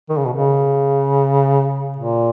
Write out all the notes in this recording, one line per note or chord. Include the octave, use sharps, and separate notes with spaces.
D#3
C#3
B2
C#3
A#2